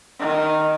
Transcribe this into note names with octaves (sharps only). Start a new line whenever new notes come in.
D#3